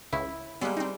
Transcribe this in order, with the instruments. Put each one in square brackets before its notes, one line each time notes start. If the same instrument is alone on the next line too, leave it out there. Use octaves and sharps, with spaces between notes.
[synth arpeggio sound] C#2 C#3 [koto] E4
[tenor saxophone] G3 [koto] G#3 [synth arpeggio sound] A#3 B3
[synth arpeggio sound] C4 D#4